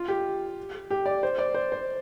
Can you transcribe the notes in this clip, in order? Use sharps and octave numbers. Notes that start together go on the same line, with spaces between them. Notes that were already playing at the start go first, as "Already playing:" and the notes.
Already playing: F4
G4
G4
D5
C5
D5
C5
C5